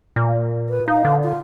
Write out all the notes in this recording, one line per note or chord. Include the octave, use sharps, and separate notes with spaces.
A#2
B4
D#4 F5
D3
F4